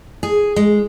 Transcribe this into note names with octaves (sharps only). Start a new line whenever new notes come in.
G#4
G#3